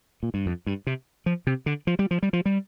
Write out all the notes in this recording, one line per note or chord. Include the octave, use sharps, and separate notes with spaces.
A#2
G2
F2
G2
C3
F3
C3
D3
F3
G3
F3
G3
F3
G3